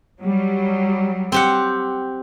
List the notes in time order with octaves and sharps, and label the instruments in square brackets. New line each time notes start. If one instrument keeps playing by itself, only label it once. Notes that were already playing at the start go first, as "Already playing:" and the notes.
[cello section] F#3 G3
[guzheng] C4 G4 F#5